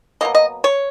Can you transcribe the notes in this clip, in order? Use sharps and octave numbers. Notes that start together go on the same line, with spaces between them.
B2 F#3 A#3 D#5
D#5
C#5